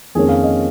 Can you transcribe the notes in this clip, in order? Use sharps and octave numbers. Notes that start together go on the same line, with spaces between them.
F2 D#3 A#3 C#4 G#4
F5
D#5